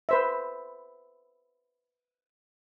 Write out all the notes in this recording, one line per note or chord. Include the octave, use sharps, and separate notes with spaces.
B4 C5 E5